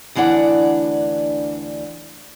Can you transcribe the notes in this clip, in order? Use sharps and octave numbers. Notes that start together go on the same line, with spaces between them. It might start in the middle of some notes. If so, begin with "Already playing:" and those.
D2 E3 D4 D5 F#5